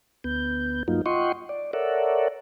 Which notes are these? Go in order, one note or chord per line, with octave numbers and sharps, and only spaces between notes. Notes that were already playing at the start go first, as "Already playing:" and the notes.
D2 B3 G6
G2 F#3 A#3 D#4 F4
F4 D#5 F#5 G5 C6 C#6
D5
A4 A#4 C#5 D5 E5 F#5